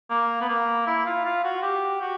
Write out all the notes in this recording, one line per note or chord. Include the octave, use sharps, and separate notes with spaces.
A#3
B3
A#3
E4
F4
F4
F#4
G4
F#4